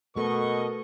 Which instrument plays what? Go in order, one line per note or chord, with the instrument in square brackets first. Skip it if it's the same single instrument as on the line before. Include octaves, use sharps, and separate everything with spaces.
[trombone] B2 [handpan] A3 A4 [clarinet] A#4 [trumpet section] D#5 C#6